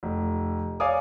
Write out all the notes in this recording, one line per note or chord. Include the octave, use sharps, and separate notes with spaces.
F1
C#5 D5 F5 G#5 D6 D#6